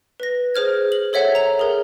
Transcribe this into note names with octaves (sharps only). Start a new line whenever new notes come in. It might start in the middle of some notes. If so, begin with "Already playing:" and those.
B4 A#6
G#4 C5 F6 G#6
F#7
A4 C#5 E5 F#5
A#5 F7
G#4 A#4